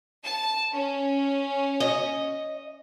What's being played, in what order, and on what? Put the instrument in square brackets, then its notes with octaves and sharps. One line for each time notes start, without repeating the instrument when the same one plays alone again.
[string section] A5
C#4
[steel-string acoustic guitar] D#5